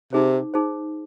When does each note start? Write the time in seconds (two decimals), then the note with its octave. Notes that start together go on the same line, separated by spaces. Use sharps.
0.13 C3 D#4 G#4 C5
0.54 D#4 G#4 C5